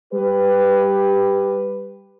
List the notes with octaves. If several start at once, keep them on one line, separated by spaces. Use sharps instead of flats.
G3 G4 B4